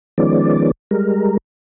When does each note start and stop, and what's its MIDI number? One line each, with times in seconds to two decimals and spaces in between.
0.18 0.71 51
0.18 0.71 53
0.18 0.71 56
0.18 0.71 59
0.18 0.71 61
0.18 0.71 74
0.91 1.37 55
0.91 1.37 56
0.91 1.37 70